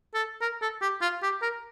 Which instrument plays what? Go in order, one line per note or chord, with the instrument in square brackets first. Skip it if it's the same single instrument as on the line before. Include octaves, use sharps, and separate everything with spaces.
[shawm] A4
A#4
A4
G4
F4
G4
A#4